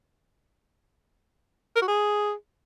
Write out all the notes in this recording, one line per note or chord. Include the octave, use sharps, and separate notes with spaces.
A#4
F#4
G#4